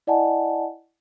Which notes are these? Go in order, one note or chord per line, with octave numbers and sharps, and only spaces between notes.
E4 D5 D#5 F#5 G#5 A5